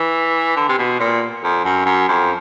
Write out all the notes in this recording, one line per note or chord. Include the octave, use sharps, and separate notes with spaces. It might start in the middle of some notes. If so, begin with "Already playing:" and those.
Already playing: E3
D3
C3
B2
A#2
F2
F#2
F#2
F2